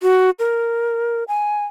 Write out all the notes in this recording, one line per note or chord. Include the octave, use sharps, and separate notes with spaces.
F#4
A#4
G#5